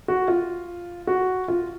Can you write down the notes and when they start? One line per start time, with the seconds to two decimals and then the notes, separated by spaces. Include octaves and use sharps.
0.08 F#4
0.28 F4
1.07 F#4
1.48 F4